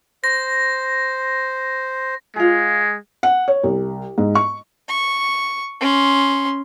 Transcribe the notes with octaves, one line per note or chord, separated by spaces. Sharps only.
C5 A#6
G#3 F4 G#4
F#5
C#5
C2
G#2
C#6
C#6
C#4 C6